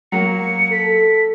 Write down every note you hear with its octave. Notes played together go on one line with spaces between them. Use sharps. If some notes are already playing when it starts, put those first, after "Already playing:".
F#3 A#3 C#7
A4 B6